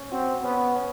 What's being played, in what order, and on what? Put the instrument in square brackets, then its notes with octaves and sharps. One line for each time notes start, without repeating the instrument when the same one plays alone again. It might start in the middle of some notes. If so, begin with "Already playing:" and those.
Already playing: [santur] C#4
[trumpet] C4 [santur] F#4
[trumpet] B3 [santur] C#4
[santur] C#4